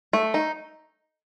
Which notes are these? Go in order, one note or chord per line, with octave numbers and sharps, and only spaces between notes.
A3
D#4